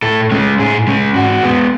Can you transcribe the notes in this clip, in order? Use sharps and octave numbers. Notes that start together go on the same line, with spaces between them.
A2 A4
G#3 C#4
A2 G#4
G#3 C#4
G#2 F#4
G#3 B3